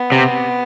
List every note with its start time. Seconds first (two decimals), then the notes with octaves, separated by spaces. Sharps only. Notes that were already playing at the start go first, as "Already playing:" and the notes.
Already playing: B3
0.12 C3